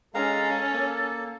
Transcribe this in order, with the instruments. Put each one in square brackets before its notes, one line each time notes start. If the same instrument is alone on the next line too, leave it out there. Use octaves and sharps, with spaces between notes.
[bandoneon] G#3 F5 A#5 [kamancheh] C#4 [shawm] A4
[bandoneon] A#3